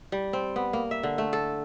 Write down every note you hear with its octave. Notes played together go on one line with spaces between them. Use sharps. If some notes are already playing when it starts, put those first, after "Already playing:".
G3
C4
B3
A#3
E5
D3
A3
A4